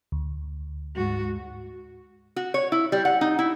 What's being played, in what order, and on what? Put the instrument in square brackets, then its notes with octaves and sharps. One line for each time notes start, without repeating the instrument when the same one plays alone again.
[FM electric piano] D2
[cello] G#2 F#4
[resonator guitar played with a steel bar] F#4
C#5
E4
G3
F#5
D#4
E4